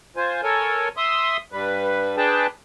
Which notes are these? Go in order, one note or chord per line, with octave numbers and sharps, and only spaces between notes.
F4 C5 G#5
A4 A#4 C#5 G#5
E5 C6 D#6
G2 G3 B4
D4 G#4 B4 G5 A5